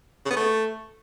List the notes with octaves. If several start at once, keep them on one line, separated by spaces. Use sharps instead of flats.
C#3
B3
A3